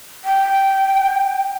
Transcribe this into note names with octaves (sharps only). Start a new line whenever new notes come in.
G5